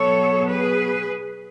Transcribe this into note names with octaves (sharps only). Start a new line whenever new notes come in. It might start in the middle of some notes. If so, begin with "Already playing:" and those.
Already playing: B2 F#3 B3 A4 C#5
G#4 B4